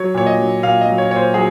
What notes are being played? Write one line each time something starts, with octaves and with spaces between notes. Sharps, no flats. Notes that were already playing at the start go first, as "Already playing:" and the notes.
Already playing: F#3 C#5
A#2 C#5
D#5
F#3
A#2 F5
D#5
F#3
C#5
A#2 C#5
C5
F#3 G#4